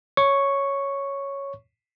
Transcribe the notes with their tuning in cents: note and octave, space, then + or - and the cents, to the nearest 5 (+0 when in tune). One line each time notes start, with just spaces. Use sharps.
C#5 +0 C#6 +0